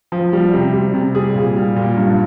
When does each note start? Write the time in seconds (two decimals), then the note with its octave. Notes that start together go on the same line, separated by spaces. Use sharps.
0.12 F3
0.33 G3
0.54 C3
0.73 G3
0.94 C3
1.15 G3 G#4
1.35 A#2
1.56 G3
1.76 A#2
1.97 G2